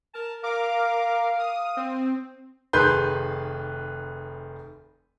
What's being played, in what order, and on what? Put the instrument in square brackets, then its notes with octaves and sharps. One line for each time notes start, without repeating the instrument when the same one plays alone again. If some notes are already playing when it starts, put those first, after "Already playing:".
[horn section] A#4 A5
[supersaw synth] A#4 D6 [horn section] F5
[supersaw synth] D#6
C4
[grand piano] F1 D#3 G#4 B4 C6 G6